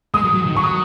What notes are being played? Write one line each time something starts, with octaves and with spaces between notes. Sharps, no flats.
G#3 D#6
F#3
F#3
D#3
F#3 C#6
D#6